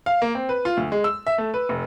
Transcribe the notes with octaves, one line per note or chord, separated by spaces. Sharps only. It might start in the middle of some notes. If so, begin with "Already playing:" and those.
F5
A#3
C4
B4
F4
D2
G#3
E6
E5
A3
B4
F1